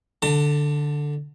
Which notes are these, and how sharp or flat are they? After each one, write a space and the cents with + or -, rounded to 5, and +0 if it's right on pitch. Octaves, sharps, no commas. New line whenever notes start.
D3 +0 A5 +40